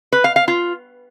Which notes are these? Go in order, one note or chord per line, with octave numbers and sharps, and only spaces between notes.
B4
F5
F5
F4